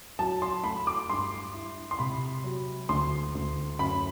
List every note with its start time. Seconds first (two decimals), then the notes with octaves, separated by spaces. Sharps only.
0.19 F#3 A5
0.42 C6
0.64 A3 B5
0.87 D6
1.10 G2 C6
1.54 E4
1.91 C6
1.99 C3 B5
2.44 F#3
2.89 D2 C6
3.35 D2
3.79 F#2 B5